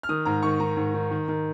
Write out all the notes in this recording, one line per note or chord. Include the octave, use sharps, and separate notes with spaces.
F6
D#3 D#6
G#2 A#5
D#3 C#6
D#3 A#5
G#2
D#3
D#3
D#3